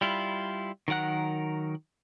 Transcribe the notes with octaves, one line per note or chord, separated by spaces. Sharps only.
G3 E4 F4
D#3 F#3 A#4 F#5 F#6